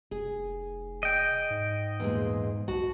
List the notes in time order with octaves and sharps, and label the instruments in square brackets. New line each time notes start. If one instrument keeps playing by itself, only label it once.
[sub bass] F1 [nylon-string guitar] G#4
[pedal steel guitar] D#5 G5
[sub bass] G#2
[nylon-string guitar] E2 A#2 G#3
[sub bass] B1 [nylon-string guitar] F#4 A5